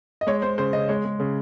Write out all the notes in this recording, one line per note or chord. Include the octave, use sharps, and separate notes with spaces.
D#5
G#3 C#5
G#3 C5
C#3 C5
C#3 D#5
G#3 C#5
G#3
C#3